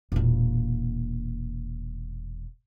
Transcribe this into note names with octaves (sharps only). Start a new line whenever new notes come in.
E1 A#2